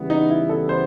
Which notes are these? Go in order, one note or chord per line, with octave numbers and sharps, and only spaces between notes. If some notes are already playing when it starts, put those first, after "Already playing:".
Already playing: C#3 E3 G3 B3
D#4
E4
A4
C5